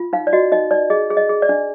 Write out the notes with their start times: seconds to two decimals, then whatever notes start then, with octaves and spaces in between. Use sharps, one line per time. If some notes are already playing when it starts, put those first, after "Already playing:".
Already playing: F4
0.13 D#4 F5
0.27 D5
0.33 F#4 D#5
0.52 D#4 D#5
0.71 D#4 D5
0.90 G#4 D#5
1.10 G#4
1.17 D#5
1.29 G#4
1.42 D5
1.49 D4